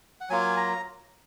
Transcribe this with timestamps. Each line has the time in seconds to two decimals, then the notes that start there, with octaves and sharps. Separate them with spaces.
0.21 F#5
0.29 F#3 A#3 F4 G#5
0.57 A#5